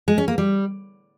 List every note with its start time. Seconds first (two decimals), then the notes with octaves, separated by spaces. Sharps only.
0.08 G#3
0.18 C#4
0.28 A#3
0.38 G3